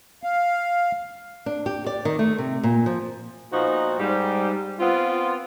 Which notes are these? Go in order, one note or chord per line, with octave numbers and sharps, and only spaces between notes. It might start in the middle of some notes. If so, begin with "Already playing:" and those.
F5
D4
G4
D5
D#3
A3
C3
A#2
F3
A#2 F3 B3 D#4 F#4
G#2 G3
B3 C4 F4